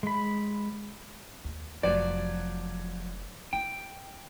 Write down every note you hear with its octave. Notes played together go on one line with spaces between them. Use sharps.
G#3 B5
D#2
F1 F3 F#3 D5
E4 G5